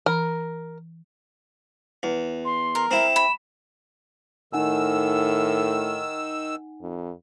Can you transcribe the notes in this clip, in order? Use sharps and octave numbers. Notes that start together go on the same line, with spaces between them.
E3 A#4 B5
E2
C6
A#4
C4 E4 E7
B5
A2 D#3 D#4 F#5 G#5 E6
F2